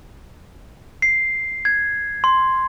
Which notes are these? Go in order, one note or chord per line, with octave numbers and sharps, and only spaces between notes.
C7
G#6
C6